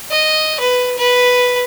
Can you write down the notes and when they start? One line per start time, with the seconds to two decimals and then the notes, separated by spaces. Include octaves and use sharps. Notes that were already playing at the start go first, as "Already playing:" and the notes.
0.11 D#5
0.60 B4
0.98 B4